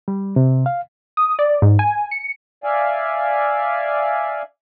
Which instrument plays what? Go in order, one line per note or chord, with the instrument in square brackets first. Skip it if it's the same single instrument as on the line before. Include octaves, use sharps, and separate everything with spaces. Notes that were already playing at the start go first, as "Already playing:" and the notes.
[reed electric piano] G3
C3
F5
[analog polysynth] D#6
D5
G#2
G#5
C#7
[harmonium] D5 E5 F5 G#5